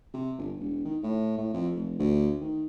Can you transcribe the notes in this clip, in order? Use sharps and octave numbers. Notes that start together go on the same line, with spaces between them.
C3
G1
E1
D#3
A2
A2
F2
F1
D2
D#3